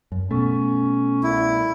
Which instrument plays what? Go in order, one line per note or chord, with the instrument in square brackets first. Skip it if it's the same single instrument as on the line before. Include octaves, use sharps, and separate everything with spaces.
[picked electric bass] F#2
[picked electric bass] B2 A3 [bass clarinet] C#4
[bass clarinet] C2 [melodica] E4